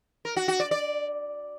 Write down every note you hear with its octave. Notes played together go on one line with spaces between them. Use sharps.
A#4
F#4
F#4
D5
D5